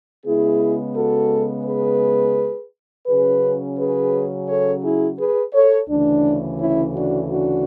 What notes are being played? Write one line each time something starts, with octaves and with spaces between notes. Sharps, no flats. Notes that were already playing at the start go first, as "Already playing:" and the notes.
C#3 G#3 B3 E4 G#4
F#4 A4
G#4 B4
C#3 F#3 C#4 G#4 B4
G#4 B4
A4 C#5
E4 G#4
G#4 B4
A4 C#5
D2 C#3 E3 A3 D4
C#4 E4
D4 F#4
D4 F#4